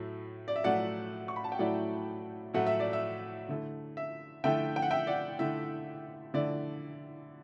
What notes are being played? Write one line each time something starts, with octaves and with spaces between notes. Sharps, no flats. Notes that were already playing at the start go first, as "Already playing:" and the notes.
Already playing: A2 F#3 A3 E4
D5
E5
A2 F#3 A3 E4 D5 F#5
C#6
B5
A5
G5
A2 F#3 A3 E4 D5 F#5
A2 F#3 A3 E4 F#5
E5
D5
E5
D3 A3 E4
E5
D3 A3 E4 E5 G5
G5
F#5
E5 G5
D5 F#5
D3 A3 E4 E5
D3 A3 E4 D5